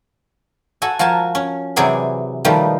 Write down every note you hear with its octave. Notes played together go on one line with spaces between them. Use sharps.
F#4 A4 G#5
F3 F#4 A#4 G#5 A5
C#4
C3 E3 F#3 G#4 D5 G#5
B2 D#3 F3 G3 A3